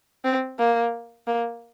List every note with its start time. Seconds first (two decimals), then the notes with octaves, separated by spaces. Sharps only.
0.25 C4
0.59 A#3
1.27 A#3